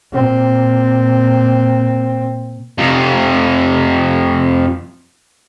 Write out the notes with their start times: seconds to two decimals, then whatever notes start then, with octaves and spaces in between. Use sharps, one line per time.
0.12 A#2 C4
2.78 F2 C3